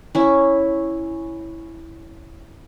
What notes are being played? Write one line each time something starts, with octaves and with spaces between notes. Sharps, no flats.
C#4 E4